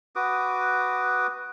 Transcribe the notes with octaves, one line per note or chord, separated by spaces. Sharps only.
F#4 B4 D6 D#6